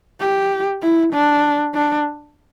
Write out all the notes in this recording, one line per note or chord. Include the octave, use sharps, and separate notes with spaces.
G4
E4
D4
D4